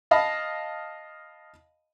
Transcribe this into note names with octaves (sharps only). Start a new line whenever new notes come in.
D#5 F5 A5 B5